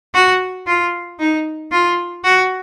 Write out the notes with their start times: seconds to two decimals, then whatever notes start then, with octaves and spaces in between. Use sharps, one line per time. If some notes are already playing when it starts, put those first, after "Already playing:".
0.14 F#4
0.67 F4
1.19 D#4
1.71 F4
2.24 F#4